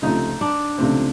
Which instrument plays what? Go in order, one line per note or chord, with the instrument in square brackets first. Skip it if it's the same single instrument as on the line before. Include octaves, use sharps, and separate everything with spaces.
[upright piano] C#2 C3 F3 A3 C4 [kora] D#4
[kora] D4
[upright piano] C#2 C3 F3 A3 C4